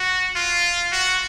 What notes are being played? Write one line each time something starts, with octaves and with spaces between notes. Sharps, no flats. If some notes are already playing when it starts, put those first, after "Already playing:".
Already playing: F#4
F4
F#4